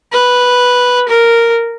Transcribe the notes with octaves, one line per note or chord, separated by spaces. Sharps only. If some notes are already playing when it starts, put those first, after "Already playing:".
B4
A#4